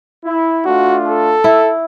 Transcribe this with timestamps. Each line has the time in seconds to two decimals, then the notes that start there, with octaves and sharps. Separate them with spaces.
0.25 E4
0.66 A3 D4 F4 F#4
1.08 A4
1.44 E4